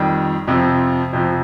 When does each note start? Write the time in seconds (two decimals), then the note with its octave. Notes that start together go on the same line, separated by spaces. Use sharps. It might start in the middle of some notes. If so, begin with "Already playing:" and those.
Already playing: F2 D#3 G3
0.47 F2 C3 F3
1.13 F2 C3 F3